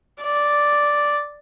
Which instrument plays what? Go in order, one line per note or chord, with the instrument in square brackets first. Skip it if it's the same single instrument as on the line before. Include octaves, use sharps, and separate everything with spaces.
[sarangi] D5